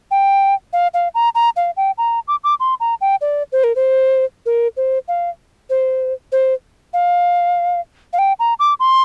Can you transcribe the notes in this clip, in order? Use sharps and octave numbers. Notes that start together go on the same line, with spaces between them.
G5
F5
F5
A#5
A#5
F5
G5
A#5
D6
D6
C6
A#5
G5
D5
C5
A#4
C5
A#4
C5
F5
C5
C5
F5
F5
G5
A#5
D6
C6